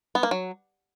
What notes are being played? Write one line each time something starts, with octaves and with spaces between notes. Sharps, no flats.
B3
A#3
F#3